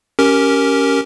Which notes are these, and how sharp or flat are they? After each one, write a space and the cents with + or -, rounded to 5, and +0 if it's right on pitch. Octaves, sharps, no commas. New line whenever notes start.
C#4 +0 G4 -10 A#4 +0